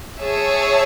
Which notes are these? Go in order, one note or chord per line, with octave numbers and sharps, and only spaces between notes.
G#4 C#5 E5 A5